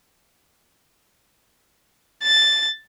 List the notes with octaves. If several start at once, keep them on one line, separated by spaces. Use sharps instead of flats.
A6